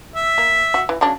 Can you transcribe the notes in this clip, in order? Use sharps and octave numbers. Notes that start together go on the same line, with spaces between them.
E5
A#3
F#4
E3
C#3 F#3 D4